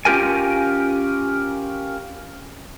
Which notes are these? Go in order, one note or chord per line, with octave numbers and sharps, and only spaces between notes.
C#4 F4 G4 A#4 G#5